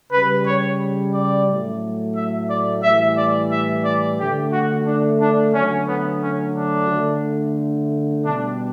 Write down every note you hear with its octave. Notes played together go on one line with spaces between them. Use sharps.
C#3 G3 B4
C#5
D5
A2 F#3 A3
E5
D5
A2 E3 G3 E5
D5
E5
D5
D3 A3 G4
F#4
D4
D4
D3 F#3 A3 C#4
B3
C#4
D4
D3 A3
B2 G3 D4